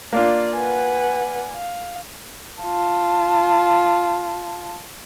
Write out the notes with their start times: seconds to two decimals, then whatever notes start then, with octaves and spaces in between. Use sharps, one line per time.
0.13 A#3 D4 F4 D5
0.56 B4 F#5 G#5
1.54 F5
2.62 F4 A5